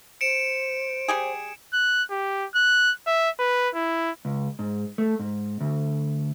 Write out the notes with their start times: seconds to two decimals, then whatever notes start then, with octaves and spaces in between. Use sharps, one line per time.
0.21 C5 C#7 D7 E7
1.08 G3 G4 G#4
1.73 F#6
2.11 G4
2.55 F#6
3.07 E5
3.39 B4
3.75 E4
4.25 C#2
4.59 G#2
4.98 A3
5.19 G#2
5.61 D2